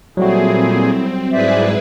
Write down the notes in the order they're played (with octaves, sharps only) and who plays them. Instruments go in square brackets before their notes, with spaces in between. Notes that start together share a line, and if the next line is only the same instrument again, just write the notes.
[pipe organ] A#2 G#4 [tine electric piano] F#3 G3 F#4 [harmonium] A3 E4 [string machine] C4
[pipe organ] G#2 [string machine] E4 G#4 B4 [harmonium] C5 D5 E5